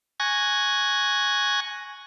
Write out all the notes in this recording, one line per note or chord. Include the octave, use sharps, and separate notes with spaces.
G#5 C#6 F#6 G#6 A#6